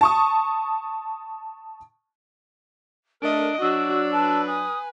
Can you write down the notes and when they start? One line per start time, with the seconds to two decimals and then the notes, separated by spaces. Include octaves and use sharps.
0.01 A5 C#6 D#6
3.22 A3 D4 A4 A#4 D#5 D7
3.61 F#3 D4 F#4 E6
4.12 B4 A5
4.47 G#5 D#6